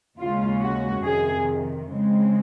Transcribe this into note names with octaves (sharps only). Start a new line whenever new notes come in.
D#2 C#3 G#3 C#4 F4
F#4
F2 C3 D#3 G#4
C#3 G#3 C4